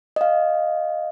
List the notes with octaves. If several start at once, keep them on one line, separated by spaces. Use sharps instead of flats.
D#5 F5